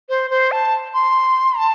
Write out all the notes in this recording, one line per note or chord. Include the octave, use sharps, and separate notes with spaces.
C5
C5
A5
C6
A5